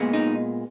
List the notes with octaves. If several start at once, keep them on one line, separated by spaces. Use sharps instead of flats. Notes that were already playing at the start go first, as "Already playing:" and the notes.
Already playing: A#2 G#3 B3
D#4